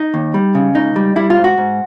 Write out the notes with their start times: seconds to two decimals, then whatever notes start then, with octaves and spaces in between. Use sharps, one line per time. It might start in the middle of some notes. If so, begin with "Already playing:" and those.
Already playing: D#4
0.14 D#2
0.34 G3
0.55 C#3
0.75 C#2 D#4
0.96 G3
1.16 G3 E4
1.30 F4
1.37 G#2
1.44 F#4
1.58 G#2